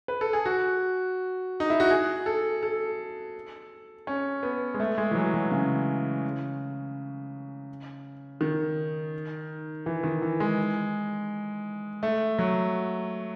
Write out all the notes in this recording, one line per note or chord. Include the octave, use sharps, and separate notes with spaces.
B4
A4
G#4
F#4
D#4
E4
F#4
G#4
A4
A4
C#4
B3
G#3
A3
G#3
E3
F#3
F#3
C#3
D#3
E3
D#3
E3
G#3
A3
F#3